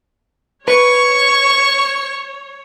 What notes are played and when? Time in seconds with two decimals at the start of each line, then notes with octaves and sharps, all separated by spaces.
0.68 B4 C#5 C#6